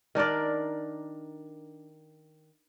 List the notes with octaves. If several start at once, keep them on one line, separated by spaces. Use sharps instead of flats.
D#3 D4 A#4 D5